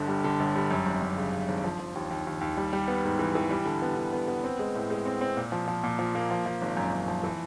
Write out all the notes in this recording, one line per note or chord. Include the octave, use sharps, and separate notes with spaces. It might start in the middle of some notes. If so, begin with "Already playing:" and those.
Already playing: G1 D3
G3
D3
G1
G3
F#2
G#1
F#2
C#3
C#3
G#1
F3
F3
D#2
D#2
D#2
D#2
G3
G3
B3
G#2
E3
E3
G3
D3
B3
D3
B3
B3
C4
G#3
A2
G#3
C4
C4
A#2
F3
F3
A#2
F3
A#3
F3
F3
G#1
F#2
F#2
F3
E3